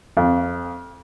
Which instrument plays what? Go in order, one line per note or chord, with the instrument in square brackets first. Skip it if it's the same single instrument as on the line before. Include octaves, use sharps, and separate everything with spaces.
[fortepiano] F2